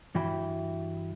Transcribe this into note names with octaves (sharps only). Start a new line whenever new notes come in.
G2 E3 F#4 G5 B5